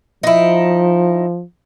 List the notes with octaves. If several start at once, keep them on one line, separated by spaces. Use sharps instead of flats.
F3 D#4 E4